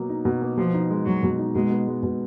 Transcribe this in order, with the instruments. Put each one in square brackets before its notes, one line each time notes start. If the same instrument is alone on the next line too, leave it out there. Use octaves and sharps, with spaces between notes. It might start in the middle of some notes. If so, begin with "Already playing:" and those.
Already playing: [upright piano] B2 F#3 A#3
D#4
B2
A#3
[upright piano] B2 [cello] F3
[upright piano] D#4
G#3
[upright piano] B2 [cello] F#3
[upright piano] B2
D#4
[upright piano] B2 [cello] G#3
[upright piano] B3
G#3
B2